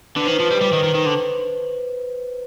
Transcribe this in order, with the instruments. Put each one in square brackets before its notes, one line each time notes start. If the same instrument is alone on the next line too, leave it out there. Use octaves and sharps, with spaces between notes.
[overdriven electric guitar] D3 [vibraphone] B4
[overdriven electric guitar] D#3 [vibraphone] C5
[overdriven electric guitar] F3 [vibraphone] B4
[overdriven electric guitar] G3
G3
D#3
D#3
D#3
D3